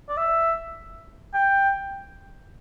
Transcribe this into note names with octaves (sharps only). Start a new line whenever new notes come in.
D5
E5
G5